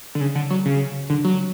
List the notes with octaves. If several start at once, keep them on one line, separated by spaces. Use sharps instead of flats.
D3
C#3
D3
F#3
C#3
D3
F#3